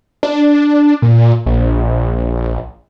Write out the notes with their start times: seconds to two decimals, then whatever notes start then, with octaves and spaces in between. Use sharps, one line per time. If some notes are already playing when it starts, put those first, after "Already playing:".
0.23 D4
1.02 A#2
1.46 A#1